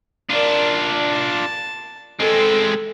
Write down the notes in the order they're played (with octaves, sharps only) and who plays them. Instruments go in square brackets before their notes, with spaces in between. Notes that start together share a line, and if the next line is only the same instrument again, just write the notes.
[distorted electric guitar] D4 F4 [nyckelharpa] A#4 D5
[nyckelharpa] A5
[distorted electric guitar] G#3 C4 [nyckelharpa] A4